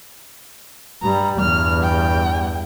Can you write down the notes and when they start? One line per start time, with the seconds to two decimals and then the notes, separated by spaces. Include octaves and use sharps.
1.03 G2 G3 A#5
1.40 E2 G2 F6
1.83 G5